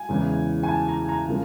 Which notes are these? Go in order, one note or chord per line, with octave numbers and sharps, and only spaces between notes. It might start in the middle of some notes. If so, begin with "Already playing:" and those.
Already playing: G#5
E2 C#3 E3 G#3
G#5
A5
A#5
A#5
C#3 F3 A#3